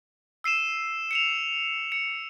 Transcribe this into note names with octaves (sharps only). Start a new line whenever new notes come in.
E6 C7 D#7 E7
C#7 E7 F7
C#7